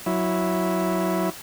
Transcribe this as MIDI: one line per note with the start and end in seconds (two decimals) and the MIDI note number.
0.06 1.30 54
0.06 1.30 64